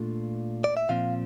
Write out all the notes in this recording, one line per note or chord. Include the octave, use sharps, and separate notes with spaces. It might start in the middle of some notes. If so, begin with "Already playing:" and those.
Already playing: A#2 A3 D4 F4
D5
E5
A#2 F3 C4 F5